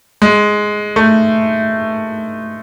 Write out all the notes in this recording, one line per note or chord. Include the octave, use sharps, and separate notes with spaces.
G#3
A3